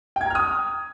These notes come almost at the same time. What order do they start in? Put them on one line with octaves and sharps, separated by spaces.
G5 G#6 A#5 F6 D#6